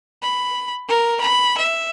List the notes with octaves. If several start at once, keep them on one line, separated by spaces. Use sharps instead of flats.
B5
A#4
B5
E5